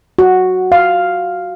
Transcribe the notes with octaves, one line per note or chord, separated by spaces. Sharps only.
F#4
F5